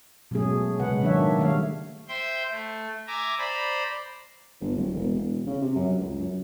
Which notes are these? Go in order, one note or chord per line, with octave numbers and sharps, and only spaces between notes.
B2 F#3 G#3 A3 C#4 G#4
C#3 G#3 B4 F#5
D#3 F#3 A#3 D4 C#5 E5
D#3 G3 A3 C#5 E5 F5
C5 E5 G5 C6 G6
A3
E5 G#5 A#5 D6
C5 D5 A#5 B5
G1
D1
E1
E1
C#3
C3
F#2
C#2
F#2